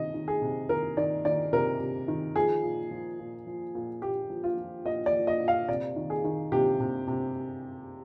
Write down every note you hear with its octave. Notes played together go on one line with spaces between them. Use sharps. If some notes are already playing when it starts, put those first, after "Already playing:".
Already playing: C3 D#3 D#5
D#3
G#4
C3
D#3 A#4
D#3 D5
D#3 D5
C3 A#4
C3
D#3
F3 G#4
A#2
F3
A#2
F3
A#2
A#2 G4
F3
F4
F3
A#2 D#5
D5
F3
D#5
A#2
F5
C3 D5
D#3
G#4
D#3
C3 G4
C3
C3